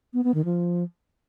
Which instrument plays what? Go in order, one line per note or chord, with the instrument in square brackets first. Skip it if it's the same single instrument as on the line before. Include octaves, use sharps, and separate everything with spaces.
[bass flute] B3
B3
D#3
F3